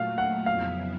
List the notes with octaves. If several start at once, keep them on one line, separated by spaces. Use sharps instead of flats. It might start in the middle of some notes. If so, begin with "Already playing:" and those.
Already playing: A#2 F#3 A3 F5
F#5
F2 C#3 F#3 B3 E4 F5